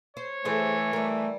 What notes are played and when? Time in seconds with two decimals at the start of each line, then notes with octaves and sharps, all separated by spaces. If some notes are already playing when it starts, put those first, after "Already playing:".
0.17 C5 C#5
0.45 E3 A3 G#4 A4 C5
0.93 G3 A3 A#4